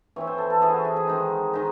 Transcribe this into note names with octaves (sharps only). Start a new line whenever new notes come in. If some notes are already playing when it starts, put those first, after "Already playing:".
E3 C4 E4 C#5
C5
A4
A4
E3 C4 E4 G#4
F#4
E4
G#4
D#3 G#3 D#4
D#3 G#3 D#4